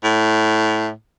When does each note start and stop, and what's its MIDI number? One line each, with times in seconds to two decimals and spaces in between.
0.04 0.91 45